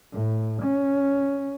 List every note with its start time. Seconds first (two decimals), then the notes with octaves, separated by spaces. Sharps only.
0.12 A2
0.62 C#4